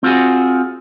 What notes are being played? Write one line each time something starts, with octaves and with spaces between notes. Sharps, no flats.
C4 F4 F#4 G#4